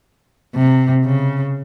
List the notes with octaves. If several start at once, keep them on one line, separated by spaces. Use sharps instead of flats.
C3
C#3